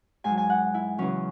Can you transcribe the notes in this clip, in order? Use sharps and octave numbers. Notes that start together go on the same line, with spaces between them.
G#2 G#5
F#3
G#5
F#5
E4
E2 C#3 F#3 C#4